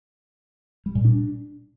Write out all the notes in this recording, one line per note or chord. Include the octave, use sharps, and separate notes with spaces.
G3
A#2
D4